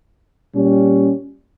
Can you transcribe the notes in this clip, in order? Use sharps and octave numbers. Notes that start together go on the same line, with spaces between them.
A#2 G3 C#4